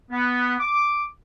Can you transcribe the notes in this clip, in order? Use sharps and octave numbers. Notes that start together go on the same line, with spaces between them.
B3
D6